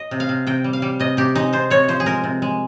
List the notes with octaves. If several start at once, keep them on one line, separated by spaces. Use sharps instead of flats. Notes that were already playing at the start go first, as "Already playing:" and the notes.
Already playing: D#5
C3
F5
C3
C3 G5
G3
F5
G3
C3 D#5
C3 G4
G#3 D#4
C3 C5
C3 C#5
F3 C5
G#4
G#3 A#4
C3
G#3